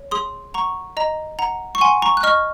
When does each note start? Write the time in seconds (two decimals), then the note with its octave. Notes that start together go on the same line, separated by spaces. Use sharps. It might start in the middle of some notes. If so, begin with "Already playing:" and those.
Already playing: C#5
0.11 G#4 C6 D#6
0.54 F#5 A#5 C#6
0.97 D#5 A#5
1.39 F#5 A#5
1.75 C#6
1.81 F#5 G#5 C6
2.02 A#5 C#6
2.17 F#6
2.23 D#5 C#6 F6